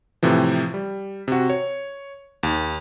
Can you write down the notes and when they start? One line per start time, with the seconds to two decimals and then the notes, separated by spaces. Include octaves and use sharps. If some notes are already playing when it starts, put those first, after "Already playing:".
0.23 A2 C3 E3 F3
0.74 G3
1.28 C3 F#4
1.50 C#5
2.43 D#2